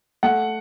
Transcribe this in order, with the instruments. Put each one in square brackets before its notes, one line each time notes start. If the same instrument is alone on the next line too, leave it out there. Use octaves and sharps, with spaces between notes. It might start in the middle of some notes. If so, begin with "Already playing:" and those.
[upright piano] A3 F#5